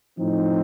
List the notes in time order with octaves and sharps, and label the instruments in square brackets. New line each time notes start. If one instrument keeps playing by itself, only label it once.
[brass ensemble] A2 F3 C4 D#4